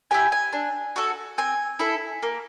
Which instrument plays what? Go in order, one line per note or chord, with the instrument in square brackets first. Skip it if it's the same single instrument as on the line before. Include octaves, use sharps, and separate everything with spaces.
[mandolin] E4 G4 G#5
G#5
D4
F#4 A4
C4 G#5
E4 A4
A#3